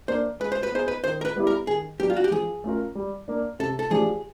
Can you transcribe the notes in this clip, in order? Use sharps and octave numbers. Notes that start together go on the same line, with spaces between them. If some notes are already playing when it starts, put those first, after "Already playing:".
A#3 D4 C5
G#3 B4
C5
B4
B3 D#4 G#4 C5
B4
D#3 C5
A#4
B4
G3 B3 E4 G4
A#4
D#3 G#4
F#3 B3 D4 G4
F4
F#4
G4
F3 G#4
A3 C#4 F4 A#4
G3
A#3 D4
C3 A4
A4
F3 A3 D4 G4 G#4